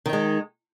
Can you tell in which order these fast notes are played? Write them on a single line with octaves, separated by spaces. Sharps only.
D#3 D#4 G#3